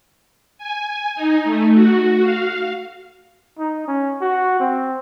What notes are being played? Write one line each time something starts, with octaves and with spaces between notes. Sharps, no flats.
G#5
D#4
A3
F#4
F5
D#4
C#4
F#4
C4